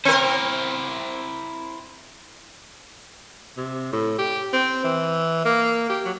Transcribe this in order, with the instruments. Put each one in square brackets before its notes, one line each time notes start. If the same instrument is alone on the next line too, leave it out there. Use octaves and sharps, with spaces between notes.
[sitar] C4 A#4 [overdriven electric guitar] E4 C5
[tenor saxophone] C3
A2
G4
C4
E3
A#3
G4
F#3